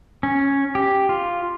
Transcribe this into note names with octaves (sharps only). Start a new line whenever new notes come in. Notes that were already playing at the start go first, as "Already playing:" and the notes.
C#4
G4
F4